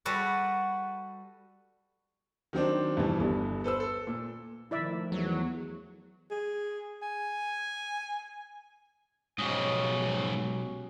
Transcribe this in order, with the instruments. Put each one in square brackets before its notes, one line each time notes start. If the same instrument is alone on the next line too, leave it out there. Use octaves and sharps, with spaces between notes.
[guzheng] G3 F#4 A4 B4
[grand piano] D#3 F#3 C4 D4
G2 B2 E3 G3
G1 G2
A4 B4 C5 E6
A4
A#2
[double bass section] D#3 F3 A3 [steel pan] E4 D5 E5
[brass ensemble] E2 [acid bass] F#3
[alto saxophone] G#4
G#5
[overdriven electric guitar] B1 D#5 [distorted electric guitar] G#2 C#3 [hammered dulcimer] C#4 F#4 G4